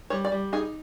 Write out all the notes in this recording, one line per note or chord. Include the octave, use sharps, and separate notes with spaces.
G3 C#5
D5
G3
D#4 G#4